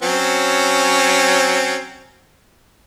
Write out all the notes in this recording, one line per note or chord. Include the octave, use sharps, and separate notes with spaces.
F#3 C4 C#4